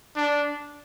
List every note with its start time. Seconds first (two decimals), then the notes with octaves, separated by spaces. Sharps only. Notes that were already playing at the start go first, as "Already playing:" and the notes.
0.16 D4